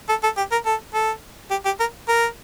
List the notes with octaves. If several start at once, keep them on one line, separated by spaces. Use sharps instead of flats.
A4
A4
G4
A#4
A4
A4
G4
G4
A#4
A#4